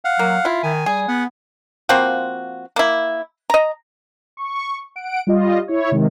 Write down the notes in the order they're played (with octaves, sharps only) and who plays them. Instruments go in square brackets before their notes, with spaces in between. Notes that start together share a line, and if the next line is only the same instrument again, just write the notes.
[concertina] F5 F#5
[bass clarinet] F#3 [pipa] A#3
[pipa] E4 [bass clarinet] F4
[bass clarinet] D#3 [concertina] G#5
[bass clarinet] G3 [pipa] G#4
[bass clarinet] B3 [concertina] F#5
[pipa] F3 A#3 C4 F#4
A#3 E4
D#5 A#5
[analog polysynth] C#6
F#5 D7
G3 F4 D#5
E4 C#5
C3 D#3 G#3